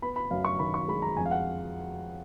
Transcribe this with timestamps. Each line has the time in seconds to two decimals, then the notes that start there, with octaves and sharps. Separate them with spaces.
0.02 B3 B5
0.16 B5
0.31 F#2 F5
0.45 C#6
0.59 D#3 B5
0.74 C#6
0.88 G#3 B5
1.02 A#5
1.17 F2 G#5
1.26 F5
1.31 F#5